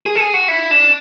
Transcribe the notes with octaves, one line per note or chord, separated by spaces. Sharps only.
G#4
A4
G#4
F#4
E4
D4